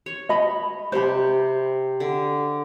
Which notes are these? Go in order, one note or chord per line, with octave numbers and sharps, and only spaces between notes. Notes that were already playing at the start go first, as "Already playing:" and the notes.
C#5
D#5 B5
C3 G4 C5 B5
D3